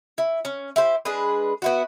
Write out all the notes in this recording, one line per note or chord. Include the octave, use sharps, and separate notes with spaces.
E4
C#4
E4 G4 C5
G#3 D4 G#4 B4
B3 E4 F#4